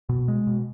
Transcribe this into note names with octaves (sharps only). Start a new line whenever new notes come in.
B2
G#3
B2